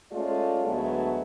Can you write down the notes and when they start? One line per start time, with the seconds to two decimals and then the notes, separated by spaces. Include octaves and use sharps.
0.12 G#3 A3 C#4 F4 A4 D5
0.64 D2 F#3 G#3 A3 B3 B4